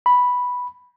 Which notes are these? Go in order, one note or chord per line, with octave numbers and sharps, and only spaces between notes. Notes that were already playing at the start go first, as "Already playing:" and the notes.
B5